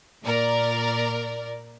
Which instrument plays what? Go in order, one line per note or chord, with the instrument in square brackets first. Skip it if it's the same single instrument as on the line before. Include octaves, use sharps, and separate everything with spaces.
[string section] A#2 A#4 D5